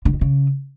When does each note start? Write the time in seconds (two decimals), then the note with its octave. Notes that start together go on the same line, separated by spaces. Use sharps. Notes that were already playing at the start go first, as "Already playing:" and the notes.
0.05 D3
0.13 D#3
0.21 C#3